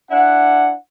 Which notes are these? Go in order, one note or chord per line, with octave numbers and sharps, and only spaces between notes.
D4 E4 F#5